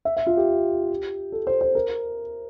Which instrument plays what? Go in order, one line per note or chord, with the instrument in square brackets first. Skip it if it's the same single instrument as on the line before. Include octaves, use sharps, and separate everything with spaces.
[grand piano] E5
E5
F4
G4
A4
C5
C5
A#4